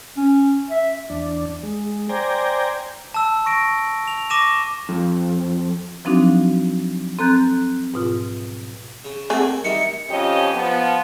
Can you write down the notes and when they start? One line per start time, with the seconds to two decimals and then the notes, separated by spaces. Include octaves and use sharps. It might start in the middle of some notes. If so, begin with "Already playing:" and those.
0.17 C#4
0.70 E5
1.10 E2 D4
1.63 G#3
2.09 C5 D5 G5 G#5 A#5
3.14 A5 E6
3.46 C#6 A#6 D7
4.08 F7
4.30 C#6 D6 A#6 D#7 E7
4.89 F2
6.05 F3 F#3 C4 D4 D#4 F#4
7.19 C4 A4 A#5 F#6 G6 A6
7.94 G#2 B2 F4
9.05 C#3
9.30 A3 A#3 C4 F#4 G#4
9.64 D#3 G3 D#4 E5 C#7
10.09 F2 F3 C#4 F4 G4 D#5
10.54 F3 B3